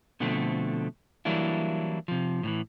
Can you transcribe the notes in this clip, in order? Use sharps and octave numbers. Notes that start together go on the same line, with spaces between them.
B2 D3 F3 A3 C4
E3 F#3 G3 A#3 D4 E4
C3 F3
A2 D#3 E3